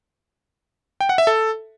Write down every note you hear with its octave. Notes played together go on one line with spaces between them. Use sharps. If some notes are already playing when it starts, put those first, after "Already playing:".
G5
F#5
E5
A4